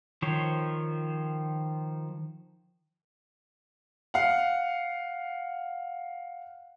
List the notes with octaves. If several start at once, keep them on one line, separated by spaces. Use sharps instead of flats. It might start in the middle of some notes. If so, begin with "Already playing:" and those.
D#3 F3 C5 C#5
F5 F#5